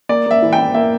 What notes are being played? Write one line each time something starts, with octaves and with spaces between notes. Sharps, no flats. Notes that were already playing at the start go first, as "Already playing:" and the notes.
A#3 D5
A#3 E5
E3
G5
E4
A#3 E5